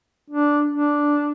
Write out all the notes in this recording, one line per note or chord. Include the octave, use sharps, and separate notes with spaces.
D4
D4